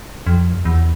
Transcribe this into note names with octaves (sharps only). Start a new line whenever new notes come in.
F2
E2